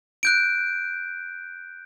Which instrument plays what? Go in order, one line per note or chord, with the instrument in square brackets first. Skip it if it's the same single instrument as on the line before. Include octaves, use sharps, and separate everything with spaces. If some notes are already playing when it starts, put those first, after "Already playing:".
[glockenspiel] F#6 G6 D7